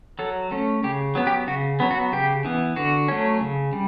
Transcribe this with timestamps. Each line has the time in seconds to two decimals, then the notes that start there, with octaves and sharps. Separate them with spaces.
0.19 F#3 A4
0.51 A3 C#4
0.83 C#3 G4
1.15 F#3 B3
1.27 G4
1.47 C#3 F#4
1.80 F#3 B3
1.91 F#4
2.12 C#3 G4
2.45 E3 B3
2.76 D3 F#4
3.08 F#3 A3 C#4
3.41 C#3
3.73 G3